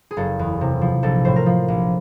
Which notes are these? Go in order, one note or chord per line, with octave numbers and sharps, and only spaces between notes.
G#4
F#1 A4
E2
C3
F3
A#1 A4
A2 C5
A#4
F3
A#1